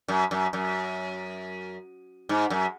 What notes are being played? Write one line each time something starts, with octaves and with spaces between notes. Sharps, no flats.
F#2
F#2
F#2
G#2
F#2